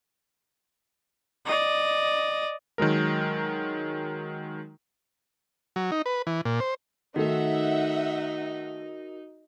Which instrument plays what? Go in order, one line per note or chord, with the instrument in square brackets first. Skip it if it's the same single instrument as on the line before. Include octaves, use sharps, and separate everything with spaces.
[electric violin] D5 D#5
[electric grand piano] D#3 F#3 G#3 A#4
[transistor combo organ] F#3
D#4
B4
E3
A#2
C5
[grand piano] D#3 A3 [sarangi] D#4 [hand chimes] F#4 A#4 [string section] E5 F#5